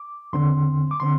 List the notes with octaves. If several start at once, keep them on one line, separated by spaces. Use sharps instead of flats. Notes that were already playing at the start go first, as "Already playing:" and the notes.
Already playing: D6
E2 D3 C4 C6
D6
D3 C4 C6